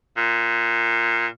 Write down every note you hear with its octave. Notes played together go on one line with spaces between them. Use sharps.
A#2